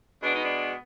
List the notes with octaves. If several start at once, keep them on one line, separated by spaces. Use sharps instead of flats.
B2 G#3 B3 D4
D#4
D4